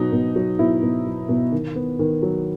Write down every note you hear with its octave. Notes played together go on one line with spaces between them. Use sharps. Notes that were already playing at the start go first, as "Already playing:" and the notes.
Already playing: B2 F#3 D#4
B2
F#3
B2 E4
B2
F#3
B2
D#3
B3
D#3
F#3